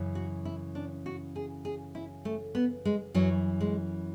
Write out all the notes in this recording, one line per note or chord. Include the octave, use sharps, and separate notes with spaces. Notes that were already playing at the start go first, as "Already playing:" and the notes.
Already playing: F#2 C#3 E3
F#4
E4
D4
F#4
G#4
G#4
E4
A3
B3
G#3
F#2 E3 F#3
G#3